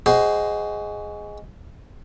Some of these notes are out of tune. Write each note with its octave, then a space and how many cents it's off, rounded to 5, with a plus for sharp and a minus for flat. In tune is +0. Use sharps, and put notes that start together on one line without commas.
G#3 +0 F#4 +25 C5 +0